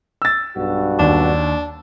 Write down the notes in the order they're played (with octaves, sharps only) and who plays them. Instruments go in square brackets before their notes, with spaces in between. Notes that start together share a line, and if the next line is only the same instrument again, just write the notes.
[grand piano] E6 A6
[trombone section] B1 G2 F#4
[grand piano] D#2 [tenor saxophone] D4